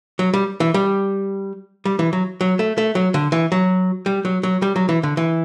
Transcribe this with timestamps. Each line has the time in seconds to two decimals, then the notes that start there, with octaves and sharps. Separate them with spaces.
0.19 F#3
0.34 G3
0.60 E3
0.74 G3
1.85 G3
1.99 E3
2.13 F#3
2.41 F#3
2.59 A3
2.78 A3
2.95 F#3
3.14 D3
3.32 E3
3.52 F#3
4.06 G3
4.25 F#3
4.43 F#3
4.62 G3
4.76 F#3
4.89 E3
5.03 D3
5.17 E3